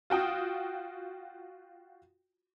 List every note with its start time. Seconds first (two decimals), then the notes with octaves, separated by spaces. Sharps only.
0.10 F4 F#4 G5 D#6